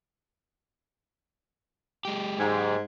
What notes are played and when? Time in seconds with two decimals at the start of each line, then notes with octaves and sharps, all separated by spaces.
2.05 G#3 G4
2.39 G#2